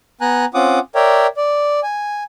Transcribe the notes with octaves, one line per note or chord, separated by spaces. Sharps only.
B3 G#5 A#5 F#6
C4 C#4 F4 F#5 D6 D#6
A#4 C#5 D5 E5 G5
D5
G#5